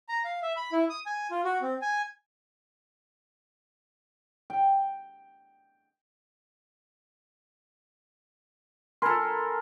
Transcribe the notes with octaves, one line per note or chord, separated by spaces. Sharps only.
A#5
F5
E5
B5
E4
D#6
G#5
F4
F#4
C4
G#5
G5
A4 A#4 G#5 B5 C6